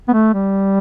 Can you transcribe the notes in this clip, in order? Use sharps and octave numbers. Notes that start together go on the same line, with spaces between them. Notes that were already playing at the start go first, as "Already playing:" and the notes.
B3
A3
G3